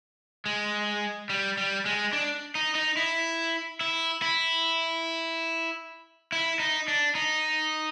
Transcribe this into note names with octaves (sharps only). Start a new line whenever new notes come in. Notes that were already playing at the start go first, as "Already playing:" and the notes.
G#3
G3
G3
G#3
D4
D#4
D#4
E4
E4
E4
E4
D#4
D4
D#4